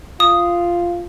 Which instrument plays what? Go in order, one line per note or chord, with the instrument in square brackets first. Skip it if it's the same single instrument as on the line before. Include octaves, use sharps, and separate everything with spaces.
[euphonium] F4 [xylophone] D#6